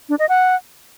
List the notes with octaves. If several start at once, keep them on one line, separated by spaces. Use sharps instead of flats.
D4
D#5
F#5